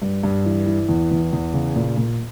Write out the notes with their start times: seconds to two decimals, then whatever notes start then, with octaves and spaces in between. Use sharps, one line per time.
0.02 G2
0.23 G2
0.45 E3
0.66 E3
0.89 E2
1.11 E2
1.33 E2
1.54 C#3
1.76 A#2
1.97 A#2